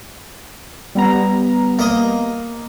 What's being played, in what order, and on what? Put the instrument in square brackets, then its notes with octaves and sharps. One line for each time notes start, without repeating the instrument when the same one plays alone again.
[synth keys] G3 B3 A#5
[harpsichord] A#3 D#5